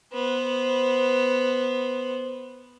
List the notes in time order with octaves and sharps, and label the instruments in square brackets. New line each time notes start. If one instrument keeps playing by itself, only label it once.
[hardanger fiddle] B3 C5